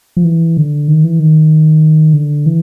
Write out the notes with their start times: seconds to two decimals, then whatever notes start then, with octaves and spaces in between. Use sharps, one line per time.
0.17 F3
0.24 E3
0.57 D3
0.88 D#3
1.04 E3
1.19 D#3
2.14 D3
2.46 E3